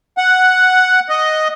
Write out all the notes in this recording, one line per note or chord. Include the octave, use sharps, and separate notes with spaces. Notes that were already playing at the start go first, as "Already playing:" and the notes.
F#5
D#5